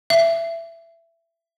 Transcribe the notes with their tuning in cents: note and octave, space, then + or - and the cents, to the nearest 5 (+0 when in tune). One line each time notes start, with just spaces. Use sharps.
E5 +15